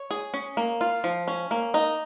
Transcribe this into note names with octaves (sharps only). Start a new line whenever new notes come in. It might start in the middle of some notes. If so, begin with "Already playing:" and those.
Already playing: C#5
G#4
C#4
A#3
F4
F3
C#4
A#3
D#4